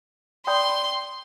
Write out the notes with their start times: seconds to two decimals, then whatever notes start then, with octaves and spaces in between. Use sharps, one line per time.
0.47 D5 G5 B5 C6 D#6 G6